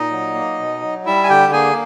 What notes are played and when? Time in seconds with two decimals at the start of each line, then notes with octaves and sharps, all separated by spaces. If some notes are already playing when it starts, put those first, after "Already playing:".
Already playing: A#2 D#4 D#5
0.11 F#3
0.34 A#3
0.58 B2
0.82 F#3
1.05 G3 E4 E5
1.24 G#5
1.29 D3 G4 G5
1.53 A#3 G#4 G#5